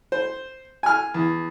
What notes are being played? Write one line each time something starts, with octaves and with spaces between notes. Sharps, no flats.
C5
G#5 F6
E2